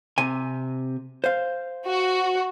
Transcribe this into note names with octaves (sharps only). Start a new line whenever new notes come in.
C3 G#5
C5 F5
F#4